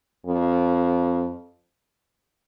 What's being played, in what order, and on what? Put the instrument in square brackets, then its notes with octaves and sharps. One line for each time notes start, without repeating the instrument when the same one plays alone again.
[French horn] F2